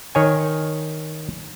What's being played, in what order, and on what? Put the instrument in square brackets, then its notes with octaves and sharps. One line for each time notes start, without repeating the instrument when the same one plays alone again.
[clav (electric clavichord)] D#3 C#5 G#5